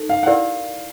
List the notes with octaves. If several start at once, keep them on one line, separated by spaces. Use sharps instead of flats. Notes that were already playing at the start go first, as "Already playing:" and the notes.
Already playing: D#4 A4
F5
F#5
E4 G4 A#4 D5 F5